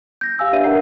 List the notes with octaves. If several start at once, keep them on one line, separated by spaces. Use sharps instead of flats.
G6 A#6
G4 F5 G#5 E6
D4 G4 B4 D5 E5 D#7
D4 A#4 E5 F#5 A#5 C7